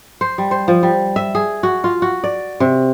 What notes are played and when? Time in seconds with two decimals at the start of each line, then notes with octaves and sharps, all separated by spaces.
0.21 C5
0.38 G3
0.51 C5
0.68 F3
0.83 G3
1.16 E5
1.35 G#4
1.63 F#4
1.84 F4
2.02 F#4
2.24 D5
2.60 C3